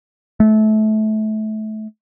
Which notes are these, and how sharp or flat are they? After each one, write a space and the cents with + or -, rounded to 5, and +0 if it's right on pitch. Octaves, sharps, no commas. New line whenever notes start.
A3 -25